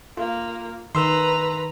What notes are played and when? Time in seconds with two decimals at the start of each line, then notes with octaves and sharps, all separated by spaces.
0.17 A#3 F4
0.95 D#3 B4 A#5 C6 E6